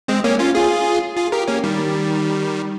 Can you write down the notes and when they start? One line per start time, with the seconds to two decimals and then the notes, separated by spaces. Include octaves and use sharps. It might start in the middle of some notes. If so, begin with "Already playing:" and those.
0.08 G#3 C4
0.24 A#3 C#4
0.39 C#4 F4
0.55 F4 G#4
1.17 F4 G#4
1.32 G4 A#4
1.48 A#3 C#4
1.64 D#3 G3